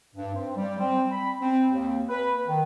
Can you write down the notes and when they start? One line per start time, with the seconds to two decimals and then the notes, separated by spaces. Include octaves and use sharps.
0.15 G2
0.34 C4
0.56 G3
0.79 C4
1.11 B5
1.41 C4
1.72 D#2
2.09 B4
2.47 D#3